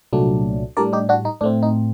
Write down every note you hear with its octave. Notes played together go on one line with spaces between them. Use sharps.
C2 A#2 F#3 A3 D4
A2 G3 D4 A#4 D5
D#4 G4
D4 F#4
D#4
A2 A3 C4 D4
D#4